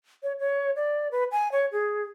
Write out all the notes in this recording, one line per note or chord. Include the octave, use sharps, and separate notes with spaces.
C#5
C#5
D5
B4
G#5
C#5
G#4